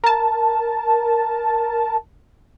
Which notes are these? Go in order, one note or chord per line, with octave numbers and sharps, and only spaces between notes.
A#4 A5